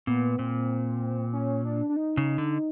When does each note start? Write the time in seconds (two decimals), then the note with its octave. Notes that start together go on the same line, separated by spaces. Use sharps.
0.07 A#2 B3
0.38 A#2 C4
1.33 C#4
1.65 D4
1.89 D4
1.96 D#4
2.17 C#3
2.38 D3